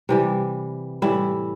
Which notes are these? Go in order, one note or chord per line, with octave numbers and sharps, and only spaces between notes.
C3 E3 G3
A2 E3 G3 E4